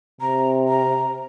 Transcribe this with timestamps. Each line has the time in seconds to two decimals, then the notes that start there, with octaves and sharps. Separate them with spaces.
0.21 C3 A#5
0.68 A#5